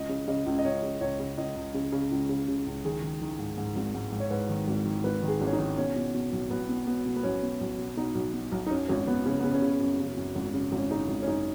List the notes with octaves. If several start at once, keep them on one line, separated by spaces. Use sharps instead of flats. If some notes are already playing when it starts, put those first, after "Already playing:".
Already playing: C#2 D#5
C#3
C#3 D#5
C#2
D#5
C#2 C#5
C#3
C#2 C#5
C#3
C#2 D#5
C#2
C#3
C#3
C#2
C#3
C#3
C#2
D#3 G#4
D#3
D#3
G#2
G#2
G#1
G#2
G#2
C#5
G#2 B4
D#3
G#1
D#3
G#1 B4
D#3
G#4
G#1
C#4
D#4
D#3
B2 C#4
B2
B2
B1
B1 B3
B2
B2 B3
B2
B3
B1 C#4
B2
B1
B2
B2 D#4
B1
B2
B1
D#4
F#2 C#4
G#1 C#4
G#1 B3
C#3 C#4
C#3 B3
C#4
C#3
F#2
C#3
F#2
G#1
C#3
G#1
C#4
C#3 D#4
G#1
C#4
F#2 D#4